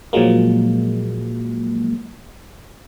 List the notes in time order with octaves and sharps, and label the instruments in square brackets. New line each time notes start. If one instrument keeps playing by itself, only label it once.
[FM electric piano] A#2 F3 F#3 G#3 A#3